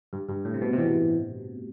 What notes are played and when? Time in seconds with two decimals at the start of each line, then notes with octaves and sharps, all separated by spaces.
0.13 G2
0.29 G2
0.45 A2
0.54 C3
0.61 B2
0.73 C3
0.78 B2 E3